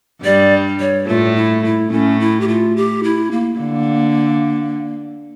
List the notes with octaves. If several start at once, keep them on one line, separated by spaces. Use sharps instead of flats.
G2 G3 D5
C#5
A2 A3 F4
E4
E4
A2 A3 C#4
E4
G4
F4
G4
E4
A#3
D3